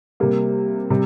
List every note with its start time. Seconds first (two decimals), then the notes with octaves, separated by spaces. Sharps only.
0.20 C3 G3 A#3
0.90 C3 G3